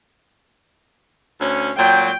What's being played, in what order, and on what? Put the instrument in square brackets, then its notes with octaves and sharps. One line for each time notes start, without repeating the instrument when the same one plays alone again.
[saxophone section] D2 C#4
[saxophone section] A#2 F#3 [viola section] G5